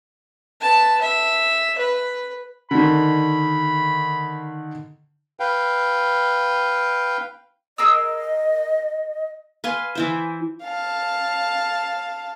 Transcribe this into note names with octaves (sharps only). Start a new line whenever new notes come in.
B4 A5
E5
B4
D3 D#3 B5
B4 F5 G5
G#4 A#4 D#5 E6
B4 F5 G#5 C6
E3 E4 C5
F5 A5